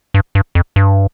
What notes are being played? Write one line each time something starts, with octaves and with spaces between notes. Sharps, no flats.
G2
G2
F2
G2